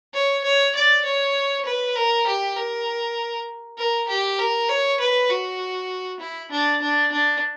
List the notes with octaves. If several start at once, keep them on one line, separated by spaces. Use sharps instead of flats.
C#5
C#5
D5
C#5
B4
A#4
G4
A#4
A#4
G4
A#4
C#5
B4
F#4
E4
D4
D4
D4